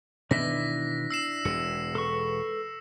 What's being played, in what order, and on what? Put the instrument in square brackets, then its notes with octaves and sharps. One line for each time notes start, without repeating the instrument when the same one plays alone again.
[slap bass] B2 D#3 E3 [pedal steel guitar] D4 E4 [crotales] A#6 B6
[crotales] E6 C7 E7
[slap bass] E1 E2 G#3 [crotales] C#7
[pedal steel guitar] A4 B4 C#6